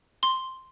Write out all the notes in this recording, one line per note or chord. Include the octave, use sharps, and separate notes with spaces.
C6